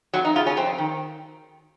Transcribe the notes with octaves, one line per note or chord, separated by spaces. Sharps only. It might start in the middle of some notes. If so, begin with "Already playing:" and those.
F2 F#3
D#4
C#3 F4
C#4
F2 C4
D#3